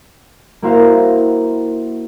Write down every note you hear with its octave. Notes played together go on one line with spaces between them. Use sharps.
A#3 E4 F#4 A#4 C5 F5